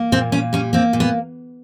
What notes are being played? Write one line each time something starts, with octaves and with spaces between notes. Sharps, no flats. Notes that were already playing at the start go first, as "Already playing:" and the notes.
Already playing: A#3
A#2 C4
A#2 C#4
G3 C#4
A#3 C4
A#2
B3